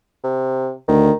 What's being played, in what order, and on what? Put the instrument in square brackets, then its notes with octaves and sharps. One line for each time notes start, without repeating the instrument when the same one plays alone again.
[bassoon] C3
[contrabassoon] D2 [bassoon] D#3